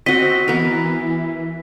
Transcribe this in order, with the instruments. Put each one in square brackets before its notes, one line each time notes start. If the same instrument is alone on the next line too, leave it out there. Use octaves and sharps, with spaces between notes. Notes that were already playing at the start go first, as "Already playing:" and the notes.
[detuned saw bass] C4 [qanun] F#4 D#5 [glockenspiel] B6
[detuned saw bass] E3 [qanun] B3 A#4